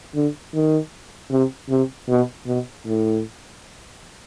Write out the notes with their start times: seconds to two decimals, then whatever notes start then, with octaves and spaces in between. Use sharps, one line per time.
0.15 D3
0.54 D#3
1.31 C3
1.70 C3
2.09 B2
2.47 B2
2.86 A2